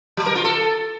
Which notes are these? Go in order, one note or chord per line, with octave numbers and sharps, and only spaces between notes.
F#3
A#4
F4
A4